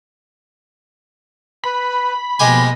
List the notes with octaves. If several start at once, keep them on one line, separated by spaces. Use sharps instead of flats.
B4 B5
B2 F3 G#3 A#3 G4 D#5 G#5